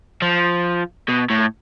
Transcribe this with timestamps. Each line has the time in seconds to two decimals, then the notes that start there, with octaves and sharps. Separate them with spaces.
0.22 F3
1.09 B2
1.30 A2